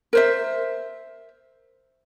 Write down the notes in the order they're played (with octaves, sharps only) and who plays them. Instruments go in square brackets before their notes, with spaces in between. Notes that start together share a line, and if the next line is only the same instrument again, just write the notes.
[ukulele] A#4 C5 E5